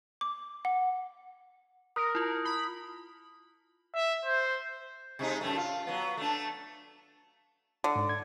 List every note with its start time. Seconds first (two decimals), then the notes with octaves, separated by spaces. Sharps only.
0.21 D6
0.65 F#5
1.96 A#4 D#6
2.15 E4 F4
2.45 B5
3.95 E5
4.25 C5
5.19 C3 G#3 D#4
5.41 F#2 G3 A3
5.57 F4
5.87 F#3 B3
6.17 A3 D4
7.84 D3
7.96 G#2
8.09 G#6